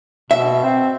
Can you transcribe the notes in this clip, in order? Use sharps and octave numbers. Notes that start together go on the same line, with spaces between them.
B2 E5
C4